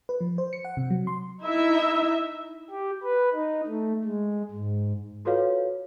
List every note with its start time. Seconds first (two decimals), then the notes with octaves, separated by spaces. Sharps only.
0.09 B4
0.21 F3
0.38 C5
0.53 C#7
0.65 F#5
0.77 C3
0.90 F#3
1.07 C6
1.43 D#4 E4 E5
2.71 G4
3.03 B4
3.34 D#4
3.67 A3
4.04 G#3
4.51 G#2
5.25 F4 F#4 A4 B4 C#5 F5